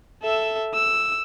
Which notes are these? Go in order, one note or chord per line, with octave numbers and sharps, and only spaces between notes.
A4 E5
E6